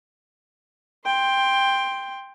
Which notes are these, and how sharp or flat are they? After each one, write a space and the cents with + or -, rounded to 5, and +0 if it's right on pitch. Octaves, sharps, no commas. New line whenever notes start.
G5 +10 C6 +0